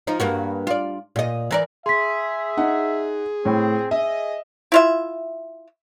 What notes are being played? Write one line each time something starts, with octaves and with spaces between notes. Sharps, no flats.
F3 D#4
G2 A#3 F#4
F4 D5
A#2 D#5
E3 A#4 D5
G#4 E5 C6 B6
D#4 F#5
A2 C4
G#4 D#5 E5
E4 F4 E5